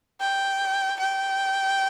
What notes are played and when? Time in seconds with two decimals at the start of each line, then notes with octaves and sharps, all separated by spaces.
0.21 G5
0.99 G5